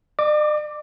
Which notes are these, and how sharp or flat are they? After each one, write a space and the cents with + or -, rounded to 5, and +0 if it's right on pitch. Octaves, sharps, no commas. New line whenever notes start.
D5 +45 D6 +0